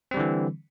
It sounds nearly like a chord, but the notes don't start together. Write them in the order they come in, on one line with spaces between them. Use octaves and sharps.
C4 G3 D3 E3